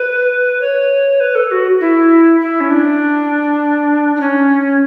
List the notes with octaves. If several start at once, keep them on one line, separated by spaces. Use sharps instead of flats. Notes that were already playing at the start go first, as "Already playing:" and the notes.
Already playing: B4
C#5
B4
A4
F#4
E4
E4
C#4
D4
D4
C#4